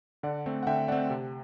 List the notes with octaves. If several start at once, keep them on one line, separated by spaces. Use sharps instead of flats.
D3 D5 F#5
A3 C4
F#5
D3 E5 G5
A3 C4 D5 F#5
C3